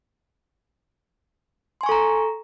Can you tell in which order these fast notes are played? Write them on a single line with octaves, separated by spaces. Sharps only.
C6 G#5 C#6 A4 A#5